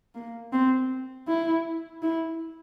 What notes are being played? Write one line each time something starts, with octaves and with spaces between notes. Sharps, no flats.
A#3
C4
E4
E4